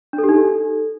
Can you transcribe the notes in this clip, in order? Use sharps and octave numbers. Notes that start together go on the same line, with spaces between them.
D4
A4
G4
D#4
A4